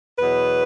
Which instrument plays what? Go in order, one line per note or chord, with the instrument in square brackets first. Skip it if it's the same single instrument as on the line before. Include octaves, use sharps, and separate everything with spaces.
[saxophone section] E2 B2 F#3 B3 B4